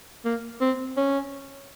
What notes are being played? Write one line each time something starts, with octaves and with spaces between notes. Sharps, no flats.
A#3
C4
C#4